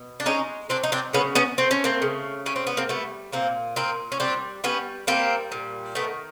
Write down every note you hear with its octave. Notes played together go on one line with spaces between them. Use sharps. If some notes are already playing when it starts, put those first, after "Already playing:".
Already playing: B2
D4
G#3 C#4 D#4
F#3 C4 D4
D#4
C4 D4
C#3 B3 C#4
B3 C#4
A3 C4
C#4
A#3 C4
C#3
G3 C#4
C4
B3
A#3 C4
G3 A3 B3
A#2 A#3 C4
A#2 A#3 C4
C#4
G3 C4 D4
G3 B3 C#4
G3 A#3 C4
A#2
D#3 A3 B3